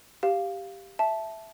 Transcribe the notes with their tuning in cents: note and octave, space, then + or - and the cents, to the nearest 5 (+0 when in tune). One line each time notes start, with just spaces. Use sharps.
G4 +0 F5 +0
E5 +0 A5 -15